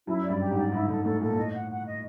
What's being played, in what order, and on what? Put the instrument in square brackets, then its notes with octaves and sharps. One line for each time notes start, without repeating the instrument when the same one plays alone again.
[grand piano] F#2 [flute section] E4
[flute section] D5
[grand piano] G2
[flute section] G4
[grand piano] G#2
[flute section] D5
[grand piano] G#2 [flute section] E4
[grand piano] G#2 [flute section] A4
[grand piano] A2 [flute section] A4
[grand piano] A#2 [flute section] A4
[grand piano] A2 [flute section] D#5
[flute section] F#5
F#5
D#5